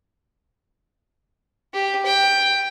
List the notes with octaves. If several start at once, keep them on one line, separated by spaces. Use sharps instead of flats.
G4
G5